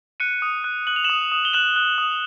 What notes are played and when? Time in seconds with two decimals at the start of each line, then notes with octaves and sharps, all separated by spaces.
0.20 F#6 C#7 D#7
0.42 D#6
0.64 F#6
0.87 F#6 F#7
0.96 F7
1.04 E7 F#7
1.10 D#6
1.32 D#6
1.45 G7
1.53 F#6 E7 F#7
1.76 F#6
1.98 D#6